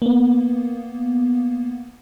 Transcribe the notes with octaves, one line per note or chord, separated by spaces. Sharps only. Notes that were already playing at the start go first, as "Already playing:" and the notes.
A#3 B3